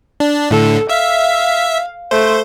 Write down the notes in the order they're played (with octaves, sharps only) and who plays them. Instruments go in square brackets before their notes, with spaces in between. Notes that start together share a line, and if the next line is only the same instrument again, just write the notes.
[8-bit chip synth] D4
[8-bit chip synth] A2 D3 [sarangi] A4
[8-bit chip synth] E5 [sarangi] F5
[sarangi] A3 [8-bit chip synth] C5